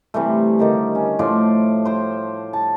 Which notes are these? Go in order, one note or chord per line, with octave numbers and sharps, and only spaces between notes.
C3 E3 G3 A3
D3 D#3 G4
C#4
A2 F3 D5 C6
C5 G5
A5